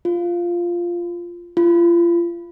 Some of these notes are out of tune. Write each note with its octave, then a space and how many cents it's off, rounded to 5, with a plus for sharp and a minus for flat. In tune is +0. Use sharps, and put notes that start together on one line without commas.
F4 -5
F4 -35